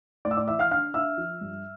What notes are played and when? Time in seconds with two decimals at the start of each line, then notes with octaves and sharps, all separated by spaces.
0.25 A2 D5 D6
0.31 E6
0.37 D5 D6
0.48 E3 E5 E6
0.59 F5 F6
0.71 D4 F5 F6
0.94 D4 E5 E6
1.17 F3
1.41 G2